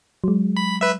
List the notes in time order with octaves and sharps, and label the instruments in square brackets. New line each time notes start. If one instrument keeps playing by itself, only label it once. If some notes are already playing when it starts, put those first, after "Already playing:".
[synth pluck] F#3 G#3
[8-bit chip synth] B5
B4 E5